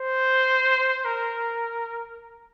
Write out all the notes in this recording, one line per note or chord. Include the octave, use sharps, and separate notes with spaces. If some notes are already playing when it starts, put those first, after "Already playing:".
Already playing: C5
A#4